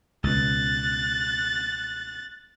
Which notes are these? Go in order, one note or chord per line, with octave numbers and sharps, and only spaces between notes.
C#2 B2 F#6 A6